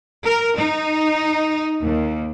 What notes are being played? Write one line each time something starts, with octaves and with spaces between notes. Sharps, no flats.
A#4
D#4
D#2